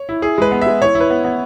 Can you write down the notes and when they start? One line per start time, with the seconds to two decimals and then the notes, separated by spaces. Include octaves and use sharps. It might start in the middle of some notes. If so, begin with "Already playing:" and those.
Already playing: C#5
0.09 E4
0.22 E4 G#4
0.38 G#3 B4
0.52 B3
0.61 E5
0.67 G#3
0.82 E4 C#5
0.95 E4
1.00 B4
1.10 B3
1.25 B3